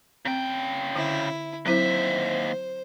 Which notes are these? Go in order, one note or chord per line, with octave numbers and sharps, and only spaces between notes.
C#3 C4 G5
D3 E4
D#2 F#3 C4 E4 C5 E5